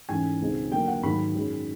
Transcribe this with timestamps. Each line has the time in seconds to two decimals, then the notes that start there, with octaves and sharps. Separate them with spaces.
0.09 G#2 E3 A3 C#4 G#5
0.41 C#2 B2 G#3 C4 D#4
0.72 D3 F#3 A#3 G5
0.88 F#5
1.03 G#2 D#3 F#3 B5
1.35 F#2 D#3 G#3